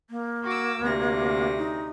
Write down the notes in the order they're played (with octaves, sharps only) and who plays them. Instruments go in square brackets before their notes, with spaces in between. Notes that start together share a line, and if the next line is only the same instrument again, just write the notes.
[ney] A#3
[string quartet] F#4 D6 E6
D2 C3 A#6
[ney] D#4